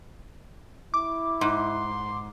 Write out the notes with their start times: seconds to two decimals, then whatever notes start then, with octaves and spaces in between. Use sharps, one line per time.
0.94 E4 D6
1.41 G#2 C6